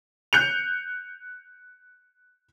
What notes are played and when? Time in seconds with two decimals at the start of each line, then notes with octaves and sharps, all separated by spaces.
0.33 F#6 G6 C#7 F7